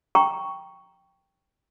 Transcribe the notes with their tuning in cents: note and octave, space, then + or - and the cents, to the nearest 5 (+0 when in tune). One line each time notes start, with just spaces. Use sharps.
G5 +0 A#5 +0 C#6 +0